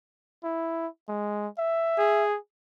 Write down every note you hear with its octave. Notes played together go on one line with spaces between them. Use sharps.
E4
G#3
E5
G#4